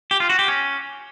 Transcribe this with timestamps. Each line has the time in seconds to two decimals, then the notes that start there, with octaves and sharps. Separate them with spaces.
0.11 G4
0.20 F4
0.30 F#4
0.39 G4
0.48 C#4